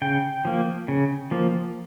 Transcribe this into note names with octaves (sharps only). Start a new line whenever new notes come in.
C#3 G5
F3 A#3
C#3
F3 A#3